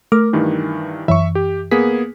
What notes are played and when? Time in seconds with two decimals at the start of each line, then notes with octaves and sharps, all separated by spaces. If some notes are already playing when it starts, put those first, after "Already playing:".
0.12 A3 A#4 D6 F6
0.33 G2 D#3 E3
1.08 F#2 E3 E5 C#6
1.35 G4
1.71 A#3 B3 G#4 B6